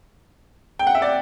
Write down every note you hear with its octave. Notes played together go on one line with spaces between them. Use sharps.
G5
F#5
E5
D5